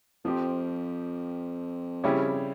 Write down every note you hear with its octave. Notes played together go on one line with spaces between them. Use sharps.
F2 F3 C4 G4
C#3 G3 C#4 E4 G4